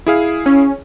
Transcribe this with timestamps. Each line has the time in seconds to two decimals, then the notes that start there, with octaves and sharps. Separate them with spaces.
0.06 E4 G#4 F5
0.46 C#4